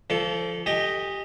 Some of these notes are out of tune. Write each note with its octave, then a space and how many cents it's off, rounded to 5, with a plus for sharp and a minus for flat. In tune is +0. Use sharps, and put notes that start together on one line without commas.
F3 -20 A4 +0 D5 -35
G4 +0 D#5 +0 G#5 -35